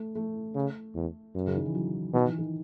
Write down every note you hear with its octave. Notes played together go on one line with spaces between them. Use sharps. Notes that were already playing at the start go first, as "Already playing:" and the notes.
Already playing: A3
A3
C#3
E2
F#2
C#3
D#3
E3
F#3
B2 D#3
E3
D#3